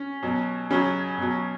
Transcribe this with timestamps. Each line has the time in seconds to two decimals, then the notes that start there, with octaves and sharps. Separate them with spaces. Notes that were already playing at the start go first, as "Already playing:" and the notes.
Already playing: C#4
0.23 B2 F#3
0.70 C#3 F#3 C#4
1.18 B2 F#3